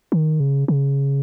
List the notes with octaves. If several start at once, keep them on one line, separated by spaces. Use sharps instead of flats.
D#3
C#3
C#3